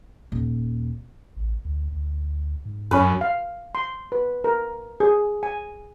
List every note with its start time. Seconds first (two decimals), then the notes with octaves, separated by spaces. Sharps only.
0.32 D#1
1.36 A1
1.65 D2
1.92 D2
2.66 G#2
2.91 F#2 C#4 B4
3.21 F5
3.75 C6
4.12 B4
4.44 A#4
5.00 G#4
5.43 G#5